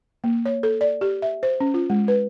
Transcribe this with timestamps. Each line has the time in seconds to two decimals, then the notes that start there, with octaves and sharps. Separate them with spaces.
0.24 A#3
0.46 C#5
0.63 A4
0.81 D5
1.01 G4
1.22 E5
1.43 C5
1.60 C#4
1.74 F4
1.90 G#3
2.08 B4